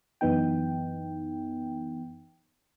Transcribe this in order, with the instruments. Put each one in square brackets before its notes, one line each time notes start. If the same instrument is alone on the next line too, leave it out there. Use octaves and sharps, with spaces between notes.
[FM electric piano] F#2 E3 B3 D#4 G5